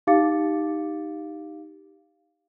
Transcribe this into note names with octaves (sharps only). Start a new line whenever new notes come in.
D#4 G4 F5 D6 A6 C#7